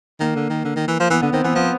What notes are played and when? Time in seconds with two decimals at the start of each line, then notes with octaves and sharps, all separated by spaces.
0.20 D#3 A#3
0.36 D3
0.50 D#3
0.65 D3
0.76 D#3
0.88 E3
1.00 F3
1.10 E3 B3
1.21 D3 B3
1.33 D#3 C4
1.44 E3 B3
1.55 F3 B3